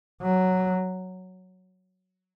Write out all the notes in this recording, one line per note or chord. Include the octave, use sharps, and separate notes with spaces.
F#3